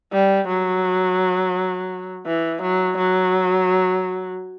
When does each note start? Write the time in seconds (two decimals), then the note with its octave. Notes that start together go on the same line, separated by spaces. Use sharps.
0.13 G3
0.48 F#3
2.27 E3
2.63 F#3
2.98 F#3